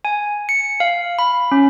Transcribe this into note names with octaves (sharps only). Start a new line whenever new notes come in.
G#5
C#7
F5
B5
C#4